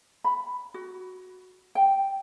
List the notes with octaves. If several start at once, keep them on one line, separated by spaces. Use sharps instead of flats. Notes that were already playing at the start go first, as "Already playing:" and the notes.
B5
F#4
G5